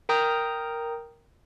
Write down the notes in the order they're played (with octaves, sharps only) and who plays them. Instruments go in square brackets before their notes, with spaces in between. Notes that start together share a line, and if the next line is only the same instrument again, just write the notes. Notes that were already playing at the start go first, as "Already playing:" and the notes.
[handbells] A#4 G5 A#5 D#6 G6